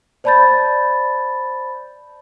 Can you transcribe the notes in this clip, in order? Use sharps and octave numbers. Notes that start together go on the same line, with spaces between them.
C5 D5 A5 B5 G6 A6